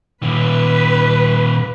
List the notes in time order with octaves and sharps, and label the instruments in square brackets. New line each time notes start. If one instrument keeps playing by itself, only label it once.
[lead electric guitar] A#2 D#3 [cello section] B4